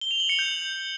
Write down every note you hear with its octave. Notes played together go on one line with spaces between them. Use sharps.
G7
F7
F#7
C#7
G6